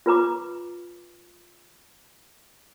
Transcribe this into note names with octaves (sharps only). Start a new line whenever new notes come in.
F4 B4 A#5 D6